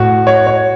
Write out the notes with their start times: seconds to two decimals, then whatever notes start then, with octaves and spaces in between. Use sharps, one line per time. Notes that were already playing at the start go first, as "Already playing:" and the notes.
Already playing: A2 F#4
0.27 C#5
0.47 C#5